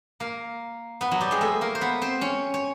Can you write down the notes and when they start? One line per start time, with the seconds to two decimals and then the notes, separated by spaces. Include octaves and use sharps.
0.20 A#3 A#4
1.01 B3 B4
1.11 F#3 F#4
1.21 G3 G4
1.31 G#3 G#4
1.41 A3 A4
1.61 A#3 A#4
1.75 C5
1.81 B3 B4
2.02 C4 C5
2.21 C#4 C#5
2.54 C#5